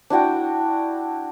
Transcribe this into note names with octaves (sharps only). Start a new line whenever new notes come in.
D4 E4 F#4 G5